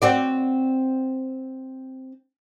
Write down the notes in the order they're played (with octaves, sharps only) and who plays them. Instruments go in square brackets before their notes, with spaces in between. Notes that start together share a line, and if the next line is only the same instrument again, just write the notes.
[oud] C4 F#4 D5